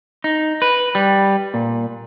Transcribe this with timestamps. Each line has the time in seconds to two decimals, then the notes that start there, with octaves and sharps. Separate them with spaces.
0.24 D#4
0.62 B4
0.95 G3
1.54 A#2